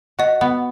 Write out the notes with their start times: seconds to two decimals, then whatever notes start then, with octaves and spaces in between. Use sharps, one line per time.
0.19 F#4 D#5
0.41 B3